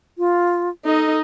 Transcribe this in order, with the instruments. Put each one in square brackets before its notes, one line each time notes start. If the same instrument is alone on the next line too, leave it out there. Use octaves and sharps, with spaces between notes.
[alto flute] F4
[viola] D#4 D#5 [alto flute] A4